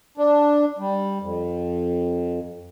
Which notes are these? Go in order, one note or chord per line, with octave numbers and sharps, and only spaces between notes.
D4
G3
F2